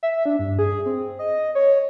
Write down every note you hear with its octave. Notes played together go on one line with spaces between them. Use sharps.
E5
D4
G2
G#4
C4
D#5
C#5